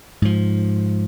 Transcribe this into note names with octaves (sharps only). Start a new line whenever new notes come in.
G#2 F3